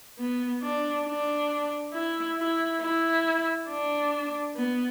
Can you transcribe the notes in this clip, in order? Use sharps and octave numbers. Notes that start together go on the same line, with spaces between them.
B3
D4
D4
E4
E4
E4
D4
B3